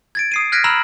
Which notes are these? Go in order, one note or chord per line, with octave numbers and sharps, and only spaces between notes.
G#6 A6 D7
D#6 C7 D#7
F6 F#6 G#6 A#6 B6 D7
A#5 B5 E6 F6 E7 F#7